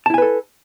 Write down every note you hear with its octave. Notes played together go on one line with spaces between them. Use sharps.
E4 A4 B4 G#5 A5